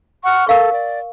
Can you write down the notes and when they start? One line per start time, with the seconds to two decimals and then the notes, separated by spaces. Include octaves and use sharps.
0.24 F#5 C#6 F6
0.47 A4 A#4 F5 C#6
0.72 D5